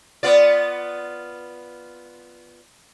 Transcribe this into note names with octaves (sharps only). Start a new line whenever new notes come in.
B3 F4 D5